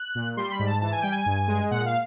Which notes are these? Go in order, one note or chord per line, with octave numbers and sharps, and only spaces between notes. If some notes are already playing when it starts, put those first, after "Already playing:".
Already playing: F#6
A#2
G3 C6
B5
G#2
A5
E3 A5
G#5
G3 G5
G#5
G2
G#3
A#2 F#5
F5